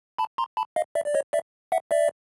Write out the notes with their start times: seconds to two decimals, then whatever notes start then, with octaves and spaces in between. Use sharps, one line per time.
0.18 A5 B5
0.38 A#5 C6
0.57 A5 B5
0.76 D#5 F5
0.95 D5 E5
1.06 D5
1.14 C#5 D#5
1.33 D5 E5
1.72 E5 F#5
1.91 D5 E5